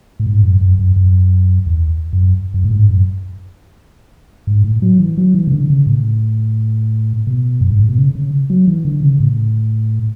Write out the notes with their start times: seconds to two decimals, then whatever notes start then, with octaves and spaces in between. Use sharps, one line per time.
0.20 A2
0.27 G#2
0.43 F#2
0.61 F#2
0.79 F#2
0.96 F#2
1.66 E2
2.13 F#2
2.54 F#2
2.64 A2
2.71 G#2
2.89 F#2
4.47 G#2
4.64 A2
4.82 F#3
4.99 E3
5.17 F#3
5.34 E3
5.47 C#3
5.52 D3
5.70 C#3
5.87 A2
7.27 B2
7.61 F#2
7.71 G#2
7.80 A2
7.89 B2
7.98 C#3
8.15 C#3
8.50 F#3
8.68 E3
8.85 D3
9.03 C#3
9.20 A2